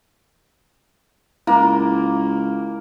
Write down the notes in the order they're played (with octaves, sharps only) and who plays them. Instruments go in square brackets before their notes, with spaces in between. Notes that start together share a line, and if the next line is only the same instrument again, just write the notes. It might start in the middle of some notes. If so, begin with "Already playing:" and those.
[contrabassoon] C#2 [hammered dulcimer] A#3 [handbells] E4